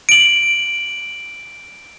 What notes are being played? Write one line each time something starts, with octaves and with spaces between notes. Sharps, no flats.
D7 F#7